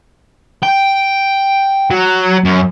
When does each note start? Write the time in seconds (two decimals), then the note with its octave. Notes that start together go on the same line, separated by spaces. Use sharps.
0.63 G5
1.91 F#3
2.44 F#2